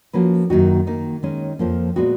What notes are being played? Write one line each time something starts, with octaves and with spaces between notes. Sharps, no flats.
F3 A#3 C#4 F#4 B4
F#2 D#3 A#3 D#4 F#4
D#3 A#3 D#4
D#3 G#3 C#4
F2 F3 A#3
A#2 G#3 B3 F#4